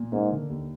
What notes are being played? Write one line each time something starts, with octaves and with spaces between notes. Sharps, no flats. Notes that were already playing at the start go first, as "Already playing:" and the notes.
Already playing: A#2
G#2 A#3
D3
D#2